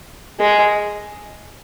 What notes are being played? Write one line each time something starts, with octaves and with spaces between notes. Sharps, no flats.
G#3